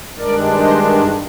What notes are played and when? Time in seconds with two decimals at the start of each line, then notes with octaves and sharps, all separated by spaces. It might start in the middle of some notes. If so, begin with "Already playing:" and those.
0.17 G2 D#3 G#3 D4 A#4 D5
0.60 C5 D#5